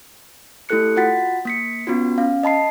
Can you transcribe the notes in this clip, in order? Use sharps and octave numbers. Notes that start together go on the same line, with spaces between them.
A3 E4 G4 A4 F#6 C#7
F4 F#4 F#5 A6 B6
A#3 B6 C#7
B3 C#4 F4 F#4
C#4 F5
D#5 A5 B5 C7